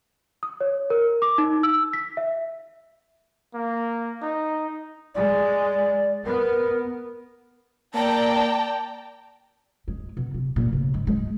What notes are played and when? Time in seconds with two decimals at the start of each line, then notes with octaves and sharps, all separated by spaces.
0.43 D#6
0.61 C#5
0.90 A#4
1.22 D6
1.38 D#4
1.63 E6
1.93 B6
2.17 E5
3.55 A#3
4.22 D#4
5.15 G#3 D5
6.26 B3 A#4
7.95 A#3 D5 G5 A5 A#5
9.88 G#3
10.17 B2
10.34 C3
10.56 A#2
10.73 C#3
10.94 G#2
11.07 G#3